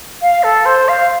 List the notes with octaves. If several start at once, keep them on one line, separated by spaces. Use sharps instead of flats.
F5
A4
C5
F5